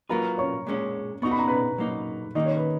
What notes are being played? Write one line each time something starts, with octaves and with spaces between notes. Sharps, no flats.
F#3 A#3 F4 A#4 B4 A#5
C#5 C#6
A#2 G#3 C#4
B3 D#4 F#4 C#6
B5
A#5
B4 B5
F#3 A#3 D#4
D#3 A#3 D#4 D#5
C#5
B4